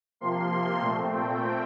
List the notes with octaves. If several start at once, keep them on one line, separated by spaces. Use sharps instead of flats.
C3 F3 A#3 C6
A#2 A3 C4
G5